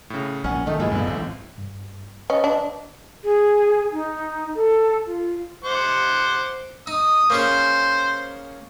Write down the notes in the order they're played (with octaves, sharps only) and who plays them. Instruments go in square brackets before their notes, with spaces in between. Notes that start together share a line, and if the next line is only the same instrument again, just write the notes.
[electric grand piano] A2 C#3
[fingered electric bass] A#1 A#2 [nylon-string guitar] C#4 F#5 [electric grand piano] F6
[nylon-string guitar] D#3 A3 D#4
[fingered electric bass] G2 F#3 A#3 [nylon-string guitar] G#3 E4 F4
[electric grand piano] C#2 D3 [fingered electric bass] F#2 A#2 B3
[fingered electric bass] A1 [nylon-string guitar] C4
[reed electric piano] G2
[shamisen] C#4 [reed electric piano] B4 D#5
[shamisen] D4
[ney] G#4
D#4
A4
F4
[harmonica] C5 F#5 D6
[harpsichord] D#4 [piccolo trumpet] D#6
[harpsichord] A#3 C#4 G#4 [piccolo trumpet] C5